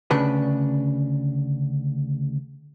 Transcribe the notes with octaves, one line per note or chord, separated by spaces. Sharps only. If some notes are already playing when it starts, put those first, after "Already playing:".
D2 C#3 D4 B4